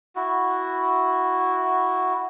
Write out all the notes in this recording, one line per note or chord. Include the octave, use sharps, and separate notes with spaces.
E4 F#4